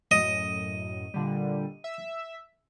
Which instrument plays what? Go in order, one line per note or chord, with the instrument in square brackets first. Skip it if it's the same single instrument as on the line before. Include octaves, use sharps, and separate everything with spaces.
[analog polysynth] F#2 A2 [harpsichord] D#5
[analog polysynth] A#2 D3 G3
E5